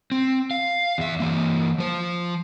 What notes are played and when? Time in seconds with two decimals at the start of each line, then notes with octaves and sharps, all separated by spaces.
0.12 C4
0.51 F5
0.98 E2 E5
1.20 E3 A#3
1.78 F3 C5